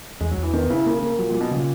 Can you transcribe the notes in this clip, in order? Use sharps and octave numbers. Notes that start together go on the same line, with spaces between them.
E2 G#3
F#3
E2
E3
D#3 B3
C#3 E4
C#3 A#3
A#3
A#2 F#3
A#2
F#3
B2
A#2 C#3